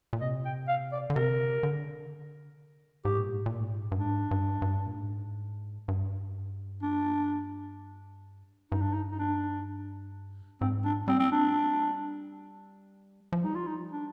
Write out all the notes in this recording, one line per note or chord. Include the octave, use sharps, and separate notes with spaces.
A#2
C3 D#5
G5
F5
D5
D3
C3 A#4
D3
G#2 G4
A#2
G#2
A#2
G#2
G2
G#2 D4
G2
G#2
G2
A#2
G#2
G2
D4
G2 D#4
D4
D#4
D#4
D4
G#2 C4
D4
G3 C4
C4
D4
F3
G3 D#4
F4
D#4
D4